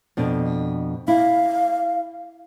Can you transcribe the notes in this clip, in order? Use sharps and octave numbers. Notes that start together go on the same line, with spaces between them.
F2 B2 D4
E4 F5